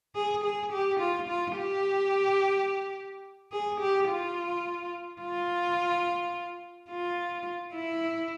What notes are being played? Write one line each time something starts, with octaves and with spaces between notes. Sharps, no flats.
G#4
G#4
G4
F4
F4
G4
G#4
G4
F4
F4
F4
E4